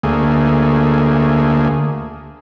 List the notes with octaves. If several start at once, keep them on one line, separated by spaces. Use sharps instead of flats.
D2 A3 A#3 G#4